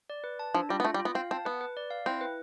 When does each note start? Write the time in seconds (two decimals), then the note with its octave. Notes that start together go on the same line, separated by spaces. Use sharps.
0.10 D5
0.24 B4
0.39 A5
0.54 F3 D4
0.69 G3 F4
0.80 B3
0.85 A3 F4
0.94 G3
1.00 F4
1.05 B3
1.15 C4 F5
1.31 C4 A5
1.45 B3 B4
1.61 B4
1.77 D5
1.91 F5
2.06 C4 E4
2.21 B4